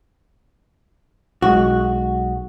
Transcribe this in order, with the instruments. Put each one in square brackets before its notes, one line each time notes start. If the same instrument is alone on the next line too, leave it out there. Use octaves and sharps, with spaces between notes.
[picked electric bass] B1 G#3 [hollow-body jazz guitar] F#4